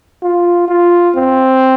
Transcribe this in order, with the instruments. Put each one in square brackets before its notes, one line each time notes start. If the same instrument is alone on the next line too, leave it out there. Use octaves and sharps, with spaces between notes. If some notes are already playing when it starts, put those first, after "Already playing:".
[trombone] F4
F4
C4